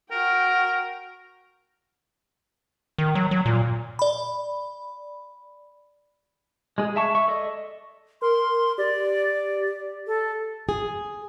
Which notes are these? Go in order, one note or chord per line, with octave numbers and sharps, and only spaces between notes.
F#4 A#4 G5
D#3
F#3
F#3
A#2
D5 B5
G#3 G#4
E5 A5 C#6
E5 C#6
A4 D5 D#5
A#4 C6
G4 D5
A4
G#4